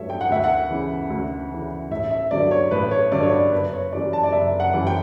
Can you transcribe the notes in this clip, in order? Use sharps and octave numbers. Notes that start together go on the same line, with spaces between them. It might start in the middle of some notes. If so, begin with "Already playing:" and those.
Already playing: A1 G2 F#3 A3 C#5 E5
G5
F#5
D2 E5
F#5
C#3 E3
D2
C#3 E3
A1 E5
E5
G2 D3 F#3 D5
C#5
A1 B4
C#5
G2 D3 F#3 D5
C#5
D5
F#1 B4
C#5
F#2 E3 G3 D5
A5
D5
F#1 E5
F#5
F#2 E3 G3
G5